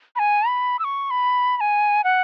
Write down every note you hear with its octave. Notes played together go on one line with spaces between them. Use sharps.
B5
G#5
B5
E6
C#6
B5
B5
G#5
F#5